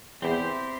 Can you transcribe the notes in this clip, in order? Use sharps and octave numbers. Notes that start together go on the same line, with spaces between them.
E2 C4 E4 G4 C5